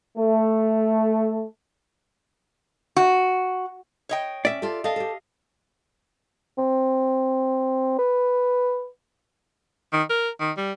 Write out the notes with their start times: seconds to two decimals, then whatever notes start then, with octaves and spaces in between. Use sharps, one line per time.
0.18 A3
2.97 F#4
4.09 C#5 D#5 G5
4.45 C#4 D5 E5
4.62 F4 G4 A4
4.84 A4 D#5 F5
4.96 G4 A4
6.58 C4
7.99 B4
9.93 D#3
10.10 A#4
10.40 D#3
10.57 G3